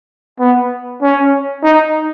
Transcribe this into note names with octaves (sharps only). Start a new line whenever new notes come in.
B3
C#4
D#4